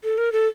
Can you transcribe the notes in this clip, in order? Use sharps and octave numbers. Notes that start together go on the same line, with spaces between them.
A4
A#4
A4